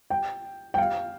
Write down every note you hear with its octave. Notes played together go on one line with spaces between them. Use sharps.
G5
G5
F5